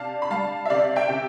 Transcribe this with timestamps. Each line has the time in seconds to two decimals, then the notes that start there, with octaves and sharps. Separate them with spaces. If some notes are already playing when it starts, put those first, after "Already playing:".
Already playing: C3 D4 F5 A5
0.22 B5
0.30 G3 F5 A5
0.65 E5
0.70 C3 D5 F5
0.96 E5 G5
1.09 C3